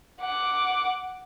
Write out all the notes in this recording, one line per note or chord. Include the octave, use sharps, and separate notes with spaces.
F#5 D6